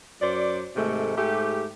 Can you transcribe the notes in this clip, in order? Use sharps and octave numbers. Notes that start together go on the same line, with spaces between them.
F#2 F#3 C5 D5
G#2 C3 D#3 A3
G#2 A3 G4